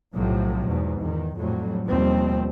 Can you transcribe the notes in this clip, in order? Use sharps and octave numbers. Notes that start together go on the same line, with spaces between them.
B1 A2 C3 F3 F#3
E2 G#2 B2
E2 D#3
F2 A2 F#3 G3
D#2 B2 F3 G3 C4